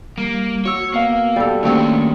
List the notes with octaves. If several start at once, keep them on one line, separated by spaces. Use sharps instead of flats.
G3 A#3
F#4 C#5 E6
A#3 B3 F5
G3 F#4 A4
G2 D#3 A3 A#3 C4 C#4 C#5